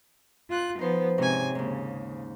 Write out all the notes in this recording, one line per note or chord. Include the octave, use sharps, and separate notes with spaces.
F4 F#6
F3 B3 D#4 C5
G#2 C3 C#4 D#5 G#5
D#2 G#2 C#3